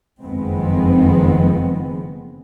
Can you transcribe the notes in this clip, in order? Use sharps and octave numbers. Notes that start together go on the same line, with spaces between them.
F#1 F2 D#3 G#3 B3 C4